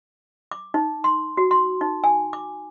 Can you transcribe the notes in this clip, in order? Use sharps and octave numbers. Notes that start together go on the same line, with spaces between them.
D6
D#4
C6
F#4
C6
D#4
G#5
D6